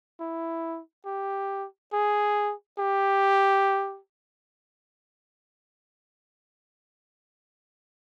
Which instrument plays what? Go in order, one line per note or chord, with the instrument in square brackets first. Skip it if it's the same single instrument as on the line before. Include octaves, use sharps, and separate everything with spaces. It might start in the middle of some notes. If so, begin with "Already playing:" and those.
[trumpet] E4
G4
G#4
G4